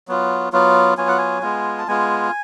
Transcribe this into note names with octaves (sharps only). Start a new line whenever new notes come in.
F#3 B3 F4
F#3 B3 F4
F#3 B3 F4 G#5
F#5
G#5
G#3 B3 F4
A5
G#3 B3 F4 G#5